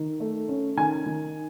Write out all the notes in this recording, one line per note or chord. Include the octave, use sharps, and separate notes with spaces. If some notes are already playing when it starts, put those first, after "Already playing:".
Already playing: D#3
A3
C#4
D#3 G#5
D#3